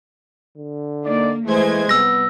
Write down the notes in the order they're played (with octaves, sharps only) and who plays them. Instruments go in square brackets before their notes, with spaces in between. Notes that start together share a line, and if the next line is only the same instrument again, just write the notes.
[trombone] D3
[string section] A#3 [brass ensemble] D#4 D5
[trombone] E3 [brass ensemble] G#3 [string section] A3 C5 G#6
[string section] C2 [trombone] B3 [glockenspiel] E6 A#6